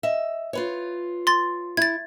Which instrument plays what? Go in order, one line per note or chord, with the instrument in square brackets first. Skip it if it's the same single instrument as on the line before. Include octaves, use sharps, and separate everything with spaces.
[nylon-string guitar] D#5 E5
F4 B4 C#5
[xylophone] C6 A6
[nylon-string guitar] E4 [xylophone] G#6 A6